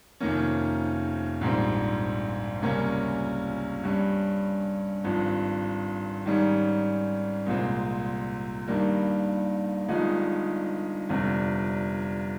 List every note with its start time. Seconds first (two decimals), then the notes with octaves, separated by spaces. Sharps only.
0.20 F1 F2 D#3 A#3 C#4
1.41 A#1 G#2 G3 C4
2.62 C#2 C3 G3 A#3 C#4
3.83 G2 G3 C#4
5.04 G#1 G2 F3
6.26 G#2 D#3 G3 C#4
7.46 C2 A#2 G#3 C4
8.68 G2 D#3 G3 A#3
9.88 G1 G2 F3 G#3 D#4
11.09 G1 F2 C3 G3